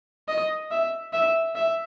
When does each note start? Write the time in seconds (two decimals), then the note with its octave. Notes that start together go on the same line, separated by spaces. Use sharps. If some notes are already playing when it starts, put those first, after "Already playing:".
0.28 D#5
0.71 E5
1.13 E5
1.56 E5